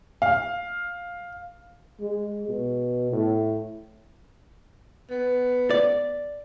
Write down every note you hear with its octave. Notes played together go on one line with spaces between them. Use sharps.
F5
G#3
B2
A2
B3
D5